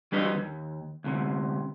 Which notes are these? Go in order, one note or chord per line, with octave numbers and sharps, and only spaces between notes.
E3 G3 D4 B4 D#5
D#2
D2 C3